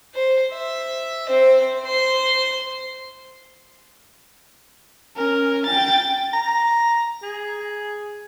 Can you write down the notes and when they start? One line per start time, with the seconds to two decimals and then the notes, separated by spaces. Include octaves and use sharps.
0.14 C5
0.53 E5
1.27 C4 C5
1.82 C5 C6
5.17 C#4 A#4
5.67 G5 A6
6.33 A#5
7.23 G#4